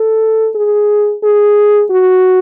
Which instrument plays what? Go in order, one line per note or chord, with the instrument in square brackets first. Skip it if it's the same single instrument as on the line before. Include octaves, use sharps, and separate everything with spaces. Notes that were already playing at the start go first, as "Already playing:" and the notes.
Already playing: [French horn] A4
G#4
G#4
F#4